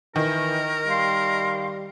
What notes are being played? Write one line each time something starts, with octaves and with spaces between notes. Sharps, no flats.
D#3 E3 A#4
G3 F5 C6